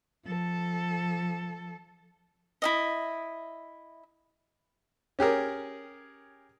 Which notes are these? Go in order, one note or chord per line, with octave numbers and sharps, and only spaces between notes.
F3 A4
E4 F4 D#5
C#4 G4 G#4 A#4